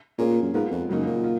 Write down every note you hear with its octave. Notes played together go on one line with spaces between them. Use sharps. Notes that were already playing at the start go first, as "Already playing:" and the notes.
A#2 A#3 C#4 G#4
F#2
G#2 G#3 B3 F4 A#4
F2
F#2 C#3 F#3 A#3 D#4
A#2
F4